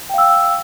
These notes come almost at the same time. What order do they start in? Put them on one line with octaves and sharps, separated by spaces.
G5 F5 E6